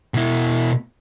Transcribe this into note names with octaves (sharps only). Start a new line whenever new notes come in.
B2 E4